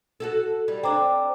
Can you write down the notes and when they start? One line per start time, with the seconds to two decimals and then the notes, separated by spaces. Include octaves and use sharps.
0.20 F#4 G4 A4
0.68 G3
0.83 C4 D4 G5 A#5 D6